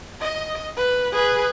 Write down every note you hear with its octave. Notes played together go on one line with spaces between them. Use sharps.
D#5
B4
G#4 B4